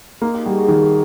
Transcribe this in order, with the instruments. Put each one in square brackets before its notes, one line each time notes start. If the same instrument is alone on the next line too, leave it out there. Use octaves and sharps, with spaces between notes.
[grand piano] A#3 [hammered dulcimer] D#4 F4
[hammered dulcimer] F4 G4
[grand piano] G3 [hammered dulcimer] F#4 G#4
[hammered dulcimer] F#4 G#4
[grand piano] D#3